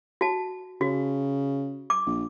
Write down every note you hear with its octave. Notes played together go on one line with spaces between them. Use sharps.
F#4 A5
C#3 F#4
D6
A#1